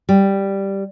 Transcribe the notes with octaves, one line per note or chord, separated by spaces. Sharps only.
G3